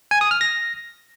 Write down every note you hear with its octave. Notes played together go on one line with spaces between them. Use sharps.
G#5
D#6
F6
A#6